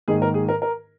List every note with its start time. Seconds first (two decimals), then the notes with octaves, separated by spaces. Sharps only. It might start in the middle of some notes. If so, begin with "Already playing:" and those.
0.08 G#2 D#3 A#3 D#4 G#4
0.22 A#4
0.34 G#4
0.49 A#4
0.62 A#4